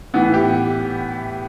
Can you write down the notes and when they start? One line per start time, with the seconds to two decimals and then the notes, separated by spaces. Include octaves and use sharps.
0.14 A2 E3 B3
0.34 G4